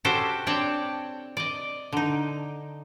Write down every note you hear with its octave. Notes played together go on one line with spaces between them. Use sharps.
C#4 F#4 G4 A4 C5
C4 D4 C#5 D5 G5 A5
D5 D#5
D3 D#4